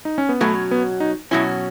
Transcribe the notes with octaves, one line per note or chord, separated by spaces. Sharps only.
D#4
C#4
B3
B2 F#3 A3 C#4
B3
D#4
B2 F#3 C#4 E4